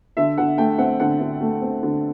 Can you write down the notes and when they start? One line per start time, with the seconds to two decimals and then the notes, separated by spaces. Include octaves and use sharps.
0.17 D3 E5
0.38 D3 F#5
0.58 A3 G5
0.78 C4 F#5
1.00 D3 F#5
1.21 D3
1.41 A3
1.62 C4
1.83 D3